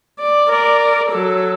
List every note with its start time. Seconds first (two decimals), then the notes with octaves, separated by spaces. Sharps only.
0.20 D5
0.49 A#4 D5
1.11 F#3 A4